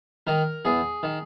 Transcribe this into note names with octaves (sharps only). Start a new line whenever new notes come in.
D#3 A#4
E2 G#4
D#3